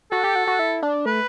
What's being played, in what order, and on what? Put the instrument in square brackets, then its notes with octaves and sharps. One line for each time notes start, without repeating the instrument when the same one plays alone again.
[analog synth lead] F#4 [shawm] A4
[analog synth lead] G4
F#4
F#4
E4
D4
[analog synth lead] A3 [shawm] B4